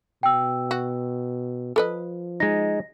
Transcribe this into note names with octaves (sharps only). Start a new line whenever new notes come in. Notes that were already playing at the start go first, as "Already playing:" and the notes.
B2 G5 E6
F#4
F3 A4 B4 D#5
G#3 D#4 A#6